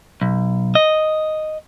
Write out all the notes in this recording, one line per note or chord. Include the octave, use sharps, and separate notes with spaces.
B1
D#5